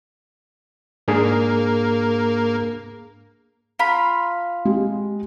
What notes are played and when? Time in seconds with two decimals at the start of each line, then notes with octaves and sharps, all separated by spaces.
1.08 G#2 A#3 D4 G#4
3.79 F4 A#5 B5
4.65 G#3 G4